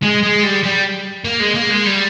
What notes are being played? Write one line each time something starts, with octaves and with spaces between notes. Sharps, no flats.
G#3
G#3
G3
G3
A#3
G#3
A#3
G#3
G3